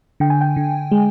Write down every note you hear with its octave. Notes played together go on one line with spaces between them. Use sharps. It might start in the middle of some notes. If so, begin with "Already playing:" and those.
D3 G5
G#5
G5
D3
G#3